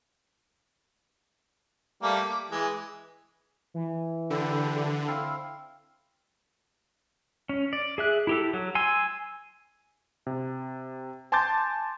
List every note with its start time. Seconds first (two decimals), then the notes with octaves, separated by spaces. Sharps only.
2.03 G3 A3 A#3
2.29 D6
2.51 E3 G#3
3.74 E3
4.30 D3 E4 G4
5.07 C4 E4 F5
7.49 C#4
7.73 D5
7.98 G#4 E5 F#6
8.27 E4 G4 A4
8.53 F#3
8.75 G#5 C6 E6
10.27 C3
11.32 G#5 A5 C6 D6 G6 A6